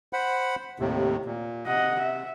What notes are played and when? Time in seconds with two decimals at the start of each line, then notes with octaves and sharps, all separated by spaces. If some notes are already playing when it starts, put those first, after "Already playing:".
0.13 C5 F#5 B5
0.80 D#2 A2 C3
1.25 A#2
1.67 C3 D#5 F#5
2.00 E5